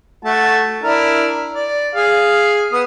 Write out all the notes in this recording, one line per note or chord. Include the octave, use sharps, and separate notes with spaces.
A3 F#4 A5
D4 E4 A#4
D5
G#4 F5
B3 D#6